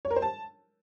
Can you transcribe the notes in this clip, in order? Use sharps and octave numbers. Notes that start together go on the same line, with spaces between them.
C#5
A#4
C5
A5